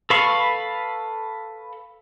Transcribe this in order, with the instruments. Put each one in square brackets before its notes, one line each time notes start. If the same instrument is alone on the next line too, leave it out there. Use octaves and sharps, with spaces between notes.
[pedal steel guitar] A4 B4 F5 B5 C#6